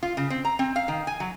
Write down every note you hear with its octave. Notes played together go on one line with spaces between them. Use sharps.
F4
C#3
C4
A#5
C4
F5
D#3
G#5
F#3